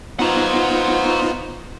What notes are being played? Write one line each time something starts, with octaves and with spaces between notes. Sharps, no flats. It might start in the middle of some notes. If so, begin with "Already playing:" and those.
B3 D#4 F4 C5 F#5 A#5